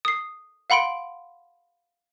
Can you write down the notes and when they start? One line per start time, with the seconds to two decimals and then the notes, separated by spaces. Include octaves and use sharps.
0.05 D#6 C7
0.70 F5 F#5 B5 C6 D7